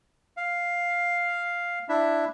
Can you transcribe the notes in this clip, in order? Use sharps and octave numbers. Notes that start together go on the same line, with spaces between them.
F5
D4 E4 E5